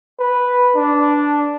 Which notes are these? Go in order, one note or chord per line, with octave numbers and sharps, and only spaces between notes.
B4
D4